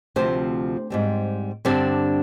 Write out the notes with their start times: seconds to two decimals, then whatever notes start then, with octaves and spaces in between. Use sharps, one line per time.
0.16 D2 C3 F3 C4 C5
0.90 G#2 G3 C4
1.65 G2 D3 G3 C4 D4 D5